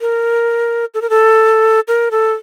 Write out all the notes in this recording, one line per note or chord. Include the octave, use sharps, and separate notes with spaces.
A#4
A4
A#4
A4
A#4
A4